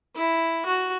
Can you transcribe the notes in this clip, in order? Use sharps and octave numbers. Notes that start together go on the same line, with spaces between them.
E4
F#4